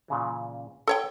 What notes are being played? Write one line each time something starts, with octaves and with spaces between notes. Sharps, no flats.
A#2 C#3 E3
A4 C#5 G5 G#5